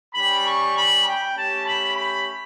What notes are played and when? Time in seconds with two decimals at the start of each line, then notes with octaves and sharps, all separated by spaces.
0.13 G3 C#4 G4 B5
0.44 C#6
0.74 B5
1.04 G5
1.34 A3 C#4 G4 A5
1.64 B5
1.94 B5